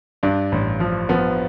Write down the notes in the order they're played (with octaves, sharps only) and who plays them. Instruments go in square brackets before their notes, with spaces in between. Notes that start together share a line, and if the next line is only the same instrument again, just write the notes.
[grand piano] G2 D4
A1
F3
F3 B3